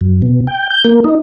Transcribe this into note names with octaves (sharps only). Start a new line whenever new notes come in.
F#2
B2
G5
G6
A#3
D#4